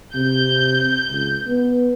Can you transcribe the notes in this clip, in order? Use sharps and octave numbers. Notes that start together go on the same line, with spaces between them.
C3 G6
C#2
B3